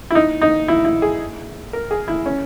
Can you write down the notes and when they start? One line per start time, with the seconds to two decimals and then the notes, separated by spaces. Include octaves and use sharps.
0.11 E4
0.15 D#4
0.41 D#4
0.68 E4
0.85 E4
1.02 G#4
1.73 A#4
1.91 G#4
2.08 E4
2.26 C#4